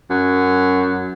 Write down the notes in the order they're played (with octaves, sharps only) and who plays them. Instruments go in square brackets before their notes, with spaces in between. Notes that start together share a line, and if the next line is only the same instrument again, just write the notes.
[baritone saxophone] F#2